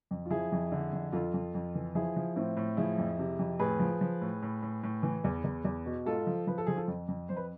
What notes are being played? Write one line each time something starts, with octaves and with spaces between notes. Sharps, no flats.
F2
F4
F3 E4 G#4
F2
D3
F2
F2 F4 A4
F2
F2
E3
F3 E4 G#4
F3
A2 C4 E4
A2
F3 E4 G#4
F2
C3
F2
A2 G#4 B4
F3
F3
A2
A2
A2
A2
E3
E2
E2
E2
B2
G#2 F4 A4
F3
F3 B4
A4
F3 G#4
F4 A4
F2
F2
F2 C5
B4